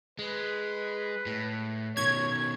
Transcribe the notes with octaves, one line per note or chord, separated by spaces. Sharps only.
G#3 B4
A2
B2 D#3 C#5 G#6